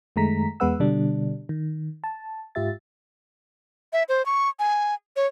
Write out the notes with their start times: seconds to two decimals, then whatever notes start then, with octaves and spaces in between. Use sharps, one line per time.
0.16 F#2 D#3 G#3 A3 A#5 B6
0.60 E2 G#3 B3 B4 F#5 E6
0.80 B2 D3 G3 D4
1.49 D#3
2.04 A5
2.55 G#2 F4 G4 E5 A6
3.93 E5
4.09 C5
4.26 C#6
4.59 G#5
5.16 C#5